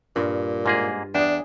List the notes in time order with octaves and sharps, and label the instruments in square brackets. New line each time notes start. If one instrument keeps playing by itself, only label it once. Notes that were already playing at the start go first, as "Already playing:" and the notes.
[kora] G2 [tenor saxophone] A#2
[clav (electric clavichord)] G#2 A#3 G#4 [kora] F4
[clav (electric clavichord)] E2 [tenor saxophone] D4 [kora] G#4 G5